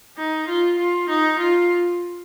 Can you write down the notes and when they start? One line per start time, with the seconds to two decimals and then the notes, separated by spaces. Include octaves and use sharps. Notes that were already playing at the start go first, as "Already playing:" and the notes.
0.17 D#4
0.48 F4
0.78 F4
1.09 D#4
1.39 F4